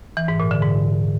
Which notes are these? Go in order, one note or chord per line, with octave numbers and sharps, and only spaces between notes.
E3
G#2
A#2
D3
G#2